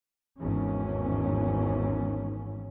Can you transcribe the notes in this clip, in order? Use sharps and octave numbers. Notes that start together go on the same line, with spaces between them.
G#1 E2 G#2 C#4